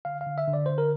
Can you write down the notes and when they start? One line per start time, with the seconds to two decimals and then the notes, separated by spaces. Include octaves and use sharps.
0.05 D3 F5
0.21 F5
0.27 D3
0.38 E5
0.48 D3
0.53 D5
0.66 D3 C5
0.78 A#4